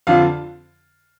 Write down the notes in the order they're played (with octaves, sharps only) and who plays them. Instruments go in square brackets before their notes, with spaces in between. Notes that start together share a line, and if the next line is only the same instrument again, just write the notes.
[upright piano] F2 D3 F3 F5